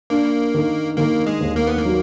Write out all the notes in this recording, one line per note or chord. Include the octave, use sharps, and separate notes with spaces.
A#3 D4
D#3
D#3 A#3
G#3
D#2
A#3
B3
A#3
F#3